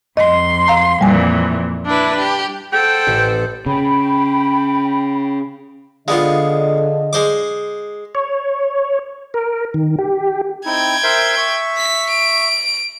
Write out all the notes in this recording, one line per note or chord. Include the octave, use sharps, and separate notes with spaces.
F2 D#5 C6
F5 A#5
F2 A#2 E3 G3 G#5
D4 E4 B4
G4
A4 C5 F#5 G5
A1
C#3 G5 B5
D3 G#3 B3 F4 G#4 D5 D#5 F5
G#3 C5 D6
C#5
A#4
D#3
G4
C4 D#4 E4 G5 G#6
A#4 C5 E5
E5 C#6
B6
D7